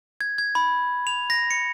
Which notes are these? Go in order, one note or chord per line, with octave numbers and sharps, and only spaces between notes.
G#6
G#6
B5
F7
A#6
C#7